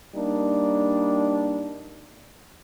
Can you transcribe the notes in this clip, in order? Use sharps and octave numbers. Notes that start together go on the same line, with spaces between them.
G3 A#3 D4 D#4